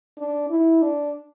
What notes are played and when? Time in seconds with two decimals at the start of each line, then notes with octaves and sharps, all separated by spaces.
0.18 D4
0.50 E4
0.82 D4